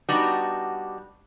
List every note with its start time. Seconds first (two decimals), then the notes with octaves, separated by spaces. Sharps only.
0.09 G3 B3 D4 D#4 F#4